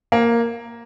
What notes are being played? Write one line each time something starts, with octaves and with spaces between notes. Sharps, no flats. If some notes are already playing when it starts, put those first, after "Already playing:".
A#3